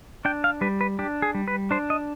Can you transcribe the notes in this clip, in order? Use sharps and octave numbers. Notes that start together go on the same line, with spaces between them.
D4 G5
F5
G3 B4
B4
D4 G4
G#4
G3
B4
D4 C5
D#5